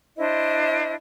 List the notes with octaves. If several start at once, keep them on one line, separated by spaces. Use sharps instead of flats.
D4 E4 C5 D#5